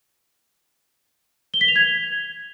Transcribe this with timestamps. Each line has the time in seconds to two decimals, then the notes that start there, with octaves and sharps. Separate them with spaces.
1.54 G7
1.61 B6
1.68 F7
1.76 G#6